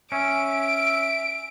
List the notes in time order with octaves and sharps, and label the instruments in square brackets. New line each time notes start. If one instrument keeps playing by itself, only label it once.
[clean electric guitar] C#4 [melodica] E5 [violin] D7